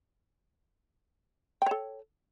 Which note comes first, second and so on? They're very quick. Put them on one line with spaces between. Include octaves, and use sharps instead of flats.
G5 C#5 A4